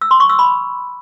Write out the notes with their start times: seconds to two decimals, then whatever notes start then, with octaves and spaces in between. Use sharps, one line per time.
0.01 E6
0.11 C6
0.20 C#6
0.29 E6
0.39 B5